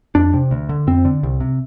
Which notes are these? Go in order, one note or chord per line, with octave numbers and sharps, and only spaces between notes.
F2 D4
C3
D2
D3
F2 C4
D3
C2
C3